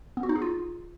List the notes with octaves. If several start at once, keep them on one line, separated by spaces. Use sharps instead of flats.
B3
F#4
D#4
G#4
F4